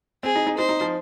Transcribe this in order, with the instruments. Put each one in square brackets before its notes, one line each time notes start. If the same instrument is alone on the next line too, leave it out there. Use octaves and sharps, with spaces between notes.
[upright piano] C4 [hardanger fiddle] G#4
[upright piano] D#4
D#4
[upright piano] D#4 [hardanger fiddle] C5
[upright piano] D#4
F3